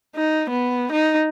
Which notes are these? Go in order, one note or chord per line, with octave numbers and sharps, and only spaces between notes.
D#4
B3
D#4